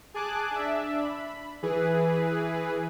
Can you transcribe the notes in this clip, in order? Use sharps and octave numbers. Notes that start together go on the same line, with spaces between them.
G#4 G#5 A5 D6 F#6
D4 E5
B5
E3 G#4 B4